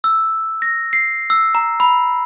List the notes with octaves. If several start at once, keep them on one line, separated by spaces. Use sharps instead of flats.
E6
A#6
C7
E6
A#5
B5